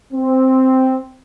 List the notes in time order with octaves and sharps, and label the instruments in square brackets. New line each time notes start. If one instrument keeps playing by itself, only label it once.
[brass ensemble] C4